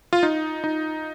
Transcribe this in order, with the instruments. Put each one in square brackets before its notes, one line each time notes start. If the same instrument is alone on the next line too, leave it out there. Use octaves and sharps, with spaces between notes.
[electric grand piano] F4
D#4
D#4